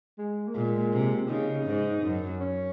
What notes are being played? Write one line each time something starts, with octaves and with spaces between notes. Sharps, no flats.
G#3
A#3
A#2 G#3
C3
C#3 D#4
G#2
F#2
C#4